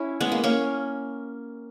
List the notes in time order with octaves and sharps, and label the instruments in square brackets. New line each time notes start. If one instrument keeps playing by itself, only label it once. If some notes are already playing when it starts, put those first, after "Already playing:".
Already playing: [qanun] C#4 E4
G#3 B3
A#3
A#3 C#4